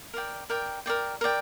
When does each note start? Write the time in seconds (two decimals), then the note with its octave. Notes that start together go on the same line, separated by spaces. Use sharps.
0.14 A#4 D5 G5
0.50 A#4 D5 G5
0.86 A#4 D5 G5
1.21 A#4 D5 G5